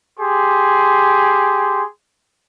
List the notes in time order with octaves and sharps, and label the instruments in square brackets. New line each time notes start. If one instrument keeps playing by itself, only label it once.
[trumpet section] G4 G#4 C6